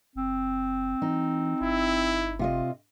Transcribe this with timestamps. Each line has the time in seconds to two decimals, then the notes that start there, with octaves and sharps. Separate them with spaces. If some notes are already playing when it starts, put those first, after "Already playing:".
0.16 F#1 C4
1.02 E3 D#4
1.61 G1 E4
2.39 C3 F4 D#5